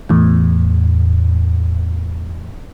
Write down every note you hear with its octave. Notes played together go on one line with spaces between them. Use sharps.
E2 A2